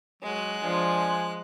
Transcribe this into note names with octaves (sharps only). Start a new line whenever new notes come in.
F#3 G#3 F#6
F3 D4 G#5